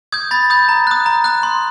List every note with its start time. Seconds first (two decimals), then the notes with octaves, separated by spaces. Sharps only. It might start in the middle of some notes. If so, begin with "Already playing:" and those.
0.12 D#6 G6 G#6
0.31 B5 A6
0.50 D#6 G6
0.69 A#5
0.87 D#6 F#6
1.06 A#5
1.24 D#6 F#6
1.43 C6